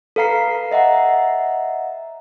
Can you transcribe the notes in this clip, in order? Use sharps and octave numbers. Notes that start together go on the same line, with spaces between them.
A4 B4 F5 A#5 C7
D#5 E5 F#5 A#5